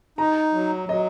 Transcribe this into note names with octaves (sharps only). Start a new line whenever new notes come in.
D#4 A#5
F#3
F#3 D#5